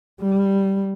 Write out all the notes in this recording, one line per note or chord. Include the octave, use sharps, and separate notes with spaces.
G3